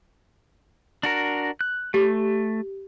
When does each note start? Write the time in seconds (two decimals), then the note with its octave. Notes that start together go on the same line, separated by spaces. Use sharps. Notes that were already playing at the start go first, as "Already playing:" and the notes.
1.03 D4 F#4 A#4
1.61 F#6
1.94 A3 G4